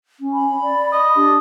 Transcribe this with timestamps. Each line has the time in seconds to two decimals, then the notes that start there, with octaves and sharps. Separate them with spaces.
0.20 C#4
0.33 B5
0.62 D5
0.93 D#5
1.16 D4 G4